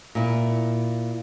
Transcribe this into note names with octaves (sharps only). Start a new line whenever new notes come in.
A#2 E4